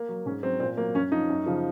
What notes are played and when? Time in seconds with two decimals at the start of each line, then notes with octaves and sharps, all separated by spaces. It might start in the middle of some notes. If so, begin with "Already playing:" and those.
Already playing: A#3
0.09 F#3
0.26 G#2 C#4
0.43 F#3 C4
0.60 A#2 C4
0.77 F#3 A#3
0.95 F#2 C#4
1.12 F3 D#4
1.30 F#2
1.46 C#3 F3